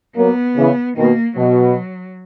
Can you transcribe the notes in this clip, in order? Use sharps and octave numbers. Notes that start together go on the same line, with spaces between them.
F#3 A#3 B3
C#3 E3
B2 D#3 A#3
B2 F#3